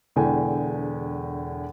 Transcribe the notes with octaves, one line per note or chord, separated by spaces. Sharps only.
E1 E2 D3 G5 G#5